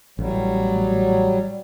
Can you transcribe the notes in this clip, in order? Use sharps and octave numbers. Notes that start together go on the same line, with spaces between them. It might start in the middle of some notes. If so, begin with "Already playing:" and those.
A1 F#3 G3